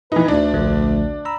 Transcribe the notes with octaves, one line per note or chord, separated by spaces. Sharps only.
E3 D#4 B4
D2 D4
A#1 D3 A3
A#5 B5 E6